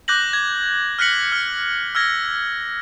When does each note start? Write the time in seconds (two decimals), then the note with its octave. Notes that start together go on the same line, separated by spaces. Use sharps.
0.08 D6 F#6 G6 A#6 F#7
0.33 G#6
0.99 F6 F#6 A#6 B6 C#7 F#7
1.32 F6
1.95 E6 F6 G#6 A#6